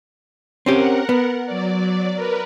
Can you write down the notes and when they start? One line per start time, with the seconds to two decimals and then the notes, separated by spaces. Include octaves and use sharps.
0.66 C4 C#4 G4 A#4 F#5
1.09 B3
1.46 F#3 D5
2.15 A#4 B4